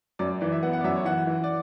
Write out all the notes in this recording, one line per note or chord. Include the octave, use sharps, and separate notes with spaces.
F#2 D5
D5
E3 D5
E5
B3 F#5
F#5
D5
F#2 E5
C#5
E3 F#5
E3
D5